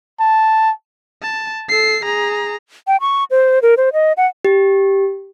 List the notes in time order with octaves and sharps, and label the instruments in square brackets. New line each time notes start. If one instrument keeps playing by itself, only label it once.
[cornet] A5
[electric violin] A5
A4 C7
G#4 A#5
[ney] G5
C#6
C5
A#4
C5
D#5
F#5
[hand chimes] G4